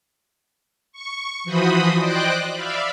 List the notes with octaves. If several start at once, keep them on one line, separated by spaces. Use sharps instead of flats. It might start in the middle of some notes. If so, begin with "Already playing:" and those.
C#6
E3 F3 F#4 C5 B5 D#6
C5 D5 D#5 G5 D6 F#6
D5 E5 F5 B5